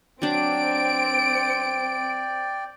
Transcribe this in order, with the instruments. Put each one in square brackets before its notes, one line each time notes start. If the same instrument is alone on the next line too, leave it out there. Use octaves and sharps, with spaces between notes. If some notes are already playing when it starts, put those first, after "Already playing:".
[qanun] F#3 D4 [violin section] C4 D7 [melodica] D5 G5